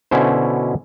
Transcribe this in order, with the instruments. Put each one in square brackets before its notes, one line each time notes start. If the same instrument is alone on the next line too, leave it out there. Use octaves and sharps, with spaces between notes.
[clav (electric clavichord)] B2 D3 C#4 E4 C5